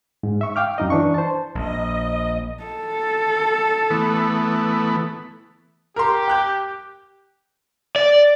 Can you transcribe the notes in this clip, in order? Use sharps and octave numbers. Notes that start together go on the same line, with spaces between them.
G#2
E5 C#6
F5 G5 D6 F6
F#2 D#4 D#5
E3 D4 C#6
C5 A5
A#1 D#5
A4
E3 A3 B3
G4 A#4 C6
G5 F#6 G6
D5